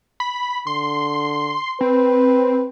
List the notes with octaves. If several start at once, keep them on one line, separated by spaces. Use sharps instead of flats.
B5
D3 C6
C4 B4